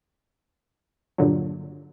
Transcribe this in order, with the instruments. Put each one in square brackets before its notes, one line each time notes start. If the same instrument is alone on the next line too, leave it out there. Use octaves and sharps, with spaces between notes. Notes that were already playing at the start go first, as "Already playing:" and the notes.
[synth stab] G2 A#2 D3 F#3